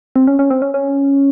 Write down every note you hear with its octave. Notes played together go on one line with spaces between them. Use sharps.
C4
C#4
C#4
C4
C#4
C#4